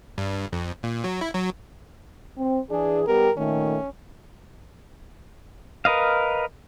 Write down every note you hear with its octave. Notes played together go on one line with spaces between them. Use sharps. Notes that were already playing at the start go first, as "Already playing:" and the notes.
G2
F2
A#2
F#3
E4
F#3
C4
E3 D4 G#4
G3 B3 G4 A#4
A#2 D#3 A3 C#4
A#4 B4 D#5 F5